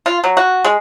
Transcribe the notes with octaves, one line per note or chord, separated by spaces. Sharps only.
F4
F#3
F#4
G#3